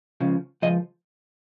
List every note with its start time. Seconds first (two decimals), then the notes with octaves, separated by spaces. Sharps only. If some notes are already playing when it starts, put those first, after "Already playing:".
0.20 C#2 C#3 F3
0.62 C#2 C#3 F3 D#5